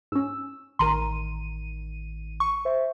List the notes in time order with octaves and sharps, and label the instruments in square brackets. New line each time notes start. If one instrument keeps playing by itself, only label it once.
[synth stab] G#2 C#4 [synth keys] E6
[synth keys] A1 D#3 D#7 [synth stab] A#4 A#5 C6
[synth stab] C#6
[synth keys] C5 E5